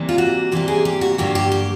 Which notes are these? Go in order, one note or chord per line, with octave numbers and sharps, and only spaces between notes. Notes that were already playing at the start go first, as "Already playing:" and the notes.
Already playing: C3 E3 G3 A#3
F4
F#4
C3 E3 G3 A#3 G4
G#4
G4
F#4
G2 D3 F#3 A#3 G4
G4
G4